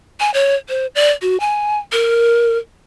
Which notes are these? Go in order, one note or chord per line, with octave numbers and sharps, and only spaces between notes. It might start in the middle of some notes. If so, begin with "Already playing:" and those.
G#5
C#5
C5
D5
F#4
G#5
A#4